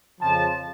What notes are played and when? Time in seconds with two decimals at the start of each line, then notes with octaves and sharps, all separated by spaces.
0.20 F2 C#3 F3 A5